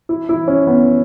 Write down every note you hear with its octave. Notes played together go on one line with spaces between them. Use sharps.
E4
E4
C#4
B3